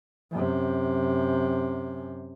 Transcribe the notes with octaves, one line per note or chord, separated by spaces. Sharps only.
F#2 C3